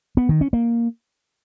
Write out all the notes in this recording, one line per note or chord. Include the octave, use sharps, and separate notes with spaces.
B3
D#3
C#4
A#3